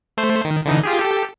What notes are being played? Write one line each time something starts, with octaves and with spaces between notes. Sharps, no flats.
A3 C5
D#3
D3 E3 D#4
F4 G4 G#4
G4 A4